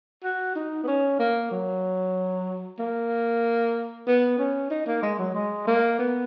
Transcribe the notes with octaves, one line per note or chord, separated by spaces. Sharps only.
F#4
D#4
B3
C#4
A#3
F#3
A#3
B3
C#4
D#4
A#3
G#3
F#3
G#3
A#3
B3